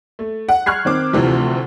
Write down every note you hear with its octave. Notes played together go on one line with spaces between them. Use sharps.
A3
F#5
C#6 F6 F#6 G#6 C7
D#3 C4 D6
D2 C3 E3 F3